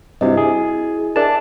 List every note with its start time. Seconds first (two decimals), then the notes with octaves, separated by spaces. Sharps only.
0.21 G2 C3 E4 F#4 D#5
0.37 G#4
1.16 D4 G#4 A#4 E5 A5